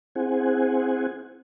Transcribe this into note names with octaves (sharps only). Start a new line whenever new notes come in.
C4 E4 G#4 C5 F#5 G#5